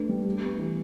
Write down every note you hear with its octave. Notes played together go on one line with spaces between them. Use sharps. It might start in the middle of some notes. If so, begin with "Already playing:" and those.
Already playing: A3 D4 B4
G3
G4
B3
E3